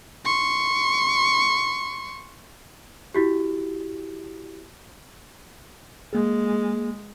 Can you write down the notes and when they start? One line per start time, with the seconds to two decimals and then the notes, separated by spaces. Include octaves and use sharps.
0.25 C6 C#6
3.14 E4 F#4 G4
6.13 G#3 A#3 G#4